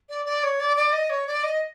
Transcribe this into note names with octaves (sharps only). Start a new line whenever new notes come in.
D5
D5
C#5
D5
D5
D#5
C#5
D5
D#5